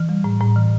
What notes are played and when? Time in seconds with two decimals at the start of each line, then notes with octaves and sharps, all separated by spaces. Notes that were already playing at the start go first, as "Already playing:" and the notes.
Already playing: E3
0.09 G3
0.24 A2
0.41 A2
0.56 E3